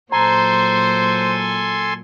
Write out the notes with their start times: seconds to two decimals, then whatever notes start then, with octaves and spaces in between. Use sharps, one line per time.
0.12 A#2 F#3 A4 C5 G#5 A#5 C6